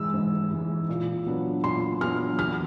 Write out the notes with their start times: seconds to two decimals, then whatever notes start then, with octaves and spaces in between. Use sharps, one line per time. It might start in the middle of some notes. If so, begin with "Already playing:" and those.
Already playing: G#2 E3 G#3 E6
0.14 G#2
0.51 E3 G#3
0.89 A#2
1.26 F#3 B3 D4
1.64 A#2 C6
2.01 F#3 B3 D4 F6
2.39 E2 F6